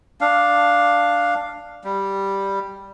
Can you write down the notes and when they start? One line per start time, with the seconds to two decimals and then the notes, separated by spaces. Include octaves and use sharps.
0.21 D4 F5
1.84 G3